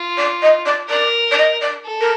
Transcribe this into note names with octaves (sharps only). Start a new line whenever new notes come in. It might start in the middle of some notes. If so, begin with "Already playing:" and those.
Already playing: F4
D5
D#5
D5
A#4 D5
D5
D#5
D5
A4
A#4